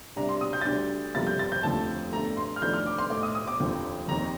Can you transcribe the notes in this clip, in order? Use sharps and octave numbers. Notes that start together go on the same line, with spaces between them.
C2 C3 G3 D4 A#5
C6
D#6
G6
A6
D2 D3 G3 D4 G6
G1 F2 C3 G3 A#3 A6
G6
A6
G6
F1 D#2 D3 F3 A3 A5
G1 G2 D3 A3 A#5
C6
F6
F2 D#3 A3 D4 G6
F6
D6
C6
A2 A3 D#4 D6
D#6
D#6
D6
F1 D#2 D3 F3 C4
F1 D#2 D#3 A#5